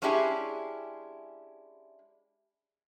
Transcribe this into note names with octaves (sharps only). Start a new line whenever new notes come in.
G#3 C#4 D4 E4 G4 G#4